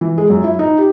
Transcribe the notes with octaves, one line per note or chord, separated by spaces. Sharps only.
E3
G#3
F#2
E4
D#4
G4